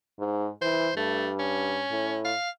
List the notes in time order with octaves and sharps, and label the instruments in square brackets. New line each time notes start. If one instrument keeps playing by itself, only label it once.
[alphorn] G#2
[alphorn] E3 [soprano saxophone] C5
[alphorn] G2 [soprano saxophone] A3
[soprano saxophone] C#4
[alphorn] A2
[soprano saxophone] F5